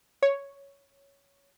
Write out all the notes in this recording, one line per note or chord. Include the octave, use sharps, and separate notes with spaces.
C#5